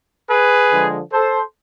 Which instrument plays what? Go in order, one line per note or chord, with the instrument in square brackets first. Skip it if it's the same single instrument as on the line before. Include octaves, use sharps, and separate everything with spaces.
[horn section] G#4 B4
D3 F3 G#3
A4 C5